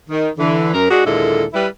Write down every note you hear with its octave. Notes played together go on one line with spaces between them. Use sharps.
D#3
D3 E3
F#2 A#4
G#3 D4 F#4
D#2 A#2 D3 G#3 E4 A4
G3 E4 B4